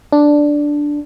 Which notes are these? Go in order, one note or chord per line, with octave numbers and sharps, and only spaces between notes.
D4